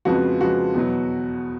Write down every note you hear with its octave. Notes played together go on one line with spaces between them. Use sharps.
F2 C#3 F3 G#3 B3 F#4
F2 C#3 F3 G#3 B3 F#4
E2 B2 F#3